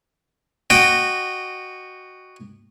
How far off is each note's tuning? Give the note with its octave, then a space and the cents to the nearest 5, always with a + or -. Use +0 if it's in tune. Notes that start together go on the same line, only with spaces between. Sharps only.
F#4 +0 D#5 -20 G5 +0